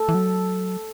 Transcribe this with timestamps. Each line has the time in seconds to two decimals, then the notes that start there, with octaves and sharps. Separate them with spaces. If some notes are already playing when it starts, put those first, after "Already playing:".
Already playing: A4
0.09 E3
0.15 F#3